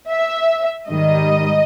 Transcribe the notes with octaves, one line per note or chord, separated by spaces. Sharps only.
E5
G#2 D#3 G3 D#5